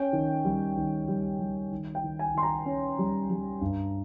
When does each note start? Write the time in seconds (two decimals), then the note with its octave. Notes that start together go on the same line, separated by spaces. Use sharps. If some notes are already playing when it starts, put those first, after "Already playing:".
Already playing: C#4 G5
0.13 D#3
0.45 G3
0.77 D#3
1.08 G3
1.39 G3
1.71 D#3
1.95 G5
2.04 D#3
2.19 G#5
2.35 D#3 C6
2.43 A#5
2.66 C#4
2.99 G3
3.30 G3
3.61 G2